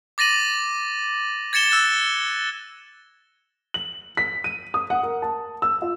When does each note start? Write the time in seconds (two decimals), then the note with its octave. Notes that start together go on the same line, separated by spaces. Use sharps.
0.18 D6 A6 A#6 D#7 F#7
1.53 G#6 A6 C#7 E7 G7
1.71 E6 F#6 A6
3.74 F#7
4.17 B6
4.44 D#7
4.74 D#6
4.90 F#5
5.03 A#4
5.22 A5
5.62 E6
5.82 F4